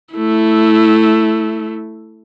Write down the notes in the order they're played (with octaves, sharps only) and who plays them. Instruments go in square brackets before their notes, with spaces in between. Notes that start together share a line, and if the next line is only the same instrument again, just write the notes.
[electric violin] A3 E4